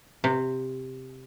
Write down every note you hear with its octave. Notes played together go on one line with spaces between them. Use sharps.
C3